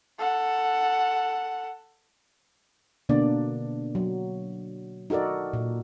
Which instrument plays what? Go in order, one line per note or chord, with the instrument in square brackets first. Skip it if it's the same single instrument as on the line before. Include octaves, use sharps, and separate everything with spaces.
[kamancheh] A4 F#5
[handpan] B2 D3 A#3 D4 D5
F#3
D#4 F#4 A4 A#4 D5
A#2